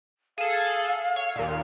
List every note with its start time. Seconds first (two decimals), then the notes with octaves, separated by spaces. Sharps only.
0.38 G#4 A4 F5
1.16 C#5
1.36 D#2 A#2